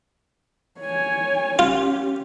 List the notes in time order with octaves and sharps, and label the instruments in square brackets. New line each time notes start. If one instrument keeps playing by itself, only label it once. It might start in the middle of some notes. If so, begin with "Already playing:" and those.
[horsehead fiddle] C#5 G#5
[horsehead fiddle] C#4 G4 [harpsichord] F4